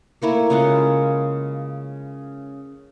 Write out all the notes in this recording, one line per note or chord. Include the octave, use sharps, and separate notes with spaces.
A3 A#3 E4 C#5
C#3 G#3 F4 F#5